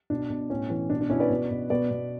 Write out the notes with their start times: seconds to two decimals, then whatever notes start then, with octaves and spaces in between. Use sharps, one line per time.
0.10 B2 D4
0.30 B2
0.50 A2 C#4
0.70 E3
0.90 B2 D4
1.01 D4
1.10 B2 C#4 E4
1.20 B4 D5
1.30 B2
1.51 B2
1.70 B2 B4 D5
1.91 B2